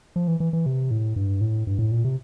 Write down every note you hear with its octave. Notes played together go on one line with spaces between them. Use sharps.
F3
E3
E3
E3
C3
A2
G2
A2
G2
A2
A#2
C3